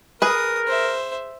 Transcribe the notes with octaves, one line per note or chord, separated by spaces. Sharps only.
G#4 A#4 B4 D#6
C5 E5